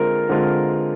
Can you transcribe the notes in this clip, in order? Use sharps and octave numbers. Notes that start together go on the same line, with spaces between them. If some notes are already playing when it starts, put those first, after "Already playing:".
Already playing: D3 G#3 C4 F4 A#4
D3 G#3 C4 F4